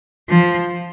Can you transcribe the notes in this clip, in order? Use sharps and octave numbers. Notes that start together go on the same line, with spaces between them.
F3